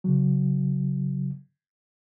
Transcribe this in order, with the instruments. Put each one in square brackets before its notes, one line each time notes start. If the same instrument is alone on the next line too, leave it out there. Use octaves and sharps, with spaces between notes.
[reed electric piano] C#3 F#3